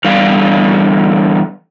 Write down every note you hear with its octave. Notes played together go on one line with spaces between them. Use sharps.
E2 D3 G3 F5